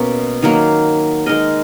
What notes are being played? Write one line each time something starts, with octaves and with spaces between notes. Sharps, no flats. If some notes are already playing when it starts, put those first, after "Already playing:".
Already playing: B2 A#3 C#4
D#3 F#3 A#3
G#3 D#4 A#4 D#5